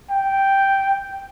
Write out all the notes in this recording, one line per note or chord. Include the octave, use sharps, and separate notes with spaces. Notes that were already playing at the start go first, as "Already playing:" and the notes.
G5